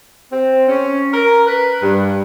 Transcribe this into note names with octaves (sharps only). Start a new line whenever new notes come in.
C4
C#4
A#4
B4
G2